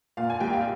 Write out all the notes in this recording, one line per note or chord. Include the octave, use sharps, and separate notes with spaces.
A#2 F5
G#5
C2 G5
F5